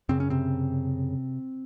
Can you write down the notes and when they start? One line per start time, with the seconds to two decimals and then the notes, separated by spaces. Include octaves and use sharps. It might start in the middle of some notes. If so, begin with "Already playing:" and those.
0.09 F#2 C#3 C4
0.20 C#4
0.30 C3 C4